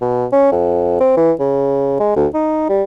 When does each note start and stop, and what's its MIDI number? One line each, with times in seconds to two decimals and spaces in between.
0.01 0.26 47
0.33 0.51 61
0.52 0.97 41
1.00 1.17 60
1.17 1.33 52
1.40 1.96 49
2.00 2.12 56
2.16 2.27 38
2.34 2.68 63
2.69 2.83 55